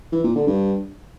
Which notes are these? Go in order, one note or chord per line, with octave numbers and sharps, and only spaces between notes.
E3
A#2
D3
G2